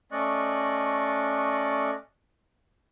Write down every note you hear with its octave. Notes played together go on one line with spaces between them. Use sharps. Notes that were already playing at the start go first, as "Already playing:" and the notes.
A3 C#4 D5 D#5 C#6 F#6